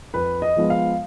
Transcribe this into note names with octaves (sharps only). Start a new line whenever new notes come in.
F2 B4
D#5
F3 G#3 B3 F4
F5